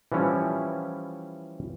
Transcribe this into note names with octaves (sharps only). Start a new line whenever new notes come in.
E3 F3 G3 C#4 E4